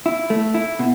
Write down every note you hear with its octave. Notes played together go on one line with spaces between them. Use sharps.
E4
A3
E4
B2